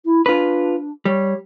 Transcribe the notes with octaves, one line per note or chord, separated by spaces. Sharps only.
E4
D4 F4 B4
G3 C#5